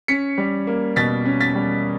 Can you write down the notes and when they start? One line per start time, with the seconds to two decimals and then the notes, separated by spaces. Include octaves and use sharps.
0.08 C#4 B6 C#7
0.38 G3
0.67 A#3
0.96 B2 A6 B6
1.25 C#4
1.40 A6 B6
1.55 G3